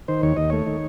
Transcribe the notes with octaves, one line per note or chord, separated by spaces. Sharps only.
D#3 C5
D#2 C#5
D#2 D#5
A3 C#5
D#3